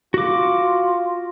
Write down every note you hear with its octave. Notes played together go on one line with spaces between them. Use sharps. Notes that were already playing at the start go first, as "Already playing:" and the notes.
F4 F#4 D6